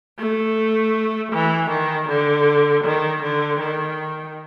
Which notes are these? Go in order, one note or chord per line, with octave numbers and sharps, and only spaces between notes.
A3
E3
D#3
D3
D#3
D3
D#3